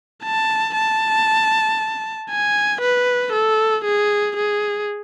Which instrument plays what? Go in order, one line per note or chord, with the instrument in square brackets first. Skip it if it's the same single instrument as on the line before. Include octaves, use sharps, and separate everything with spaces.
[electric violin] A5
A5
G#5
B4
A4
G#4
G#4